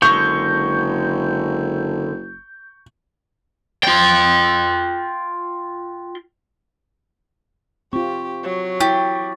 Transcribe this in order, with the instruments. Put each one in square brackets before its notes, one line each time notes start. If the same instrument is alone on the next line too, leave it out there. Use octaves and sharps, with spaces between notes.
[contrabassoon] F#1 [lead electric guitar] D3 G#3 [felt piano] C#6 [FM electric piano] G6
[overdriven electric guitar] F4 G5
[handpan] C4 F4 [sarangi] G4 [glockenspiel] C#6
[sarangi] F#3
[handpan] E4 [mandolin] G4 [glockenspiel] C#6 A6